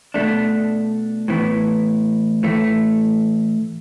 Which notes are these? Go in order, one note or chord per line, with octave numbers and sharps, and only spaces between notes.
B2 A3 D4
A2 E3 B3
A2 E3 A3